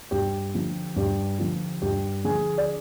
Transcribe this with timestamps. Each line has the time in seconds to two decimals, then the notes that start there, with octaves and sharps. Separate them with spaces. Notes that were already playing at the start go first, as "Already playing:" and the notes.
0.11 G2 G4
0.54 D3 F3
0.96 G2 G4
1.39 D3 F3
1.82 G2 G4
2.24 D3 F3 G#4
2.58 D5